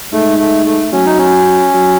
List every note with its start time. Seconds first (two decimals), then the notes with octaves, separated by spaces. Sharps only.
0.12 G#2 A3
0.39 A3
0.66 A3
0.93 F#3 C#4
1.05 D#4
1.18 C#4
1.74 F#3